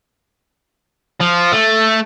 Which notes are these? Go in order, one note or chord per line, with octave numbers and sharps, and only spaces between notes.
F3
A3